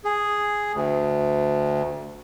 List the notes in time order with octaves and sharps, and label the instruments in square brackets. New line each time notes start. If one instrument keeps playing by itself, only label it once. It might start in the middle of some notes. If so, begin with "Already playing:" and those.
[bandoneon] G#4
D2